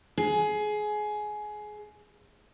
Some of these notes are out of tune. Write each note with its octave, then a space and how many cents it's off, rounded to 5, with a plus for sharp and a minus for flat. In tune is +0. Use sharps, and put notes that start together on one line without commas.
G#4 +20